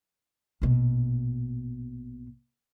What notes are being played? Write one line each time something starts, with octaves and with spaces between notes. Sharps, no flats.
A#1 B2